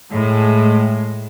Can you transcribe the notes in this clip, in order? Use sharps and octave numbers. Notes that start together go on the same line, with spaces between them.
A2 G#3